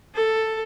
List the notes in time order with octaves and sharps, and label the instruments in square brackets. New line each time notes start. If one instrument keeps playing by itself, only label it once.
[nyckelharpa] A4